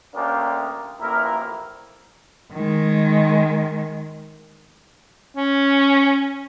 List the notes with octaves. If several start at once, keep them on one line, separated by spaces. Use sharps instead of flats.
D2 A#3 C#4 D4 G4 A#4
A1 F2 A#3 E4 A#4
D#3 G#3
C#4